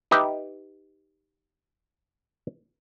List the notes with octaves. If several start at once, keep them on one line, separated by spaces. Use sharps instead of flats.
D#4 G4 B4 E5